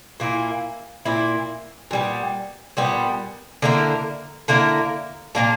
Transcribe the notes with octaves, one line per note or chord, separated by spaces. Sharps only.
A#2 A#3 E4
A#2 A#3 E4
A#2 G3 B3
A#2 G3 B3
D3 A#3 E4 A#4
D3 A#3 E4 A#4
A#2 A#3 D4 A#4